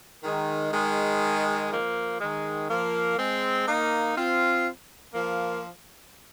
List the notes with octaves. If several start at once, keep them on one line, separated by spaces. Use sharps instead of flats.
D#3 G#3
D#3 G#3
F3 A#3
D#3 G#3
F3 A#3
G#3 C4
A#3 D#4
C4 F4
F3 A#3